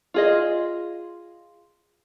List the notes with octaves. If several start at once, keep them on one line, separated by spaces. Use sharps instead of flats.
F4 G#4 D#5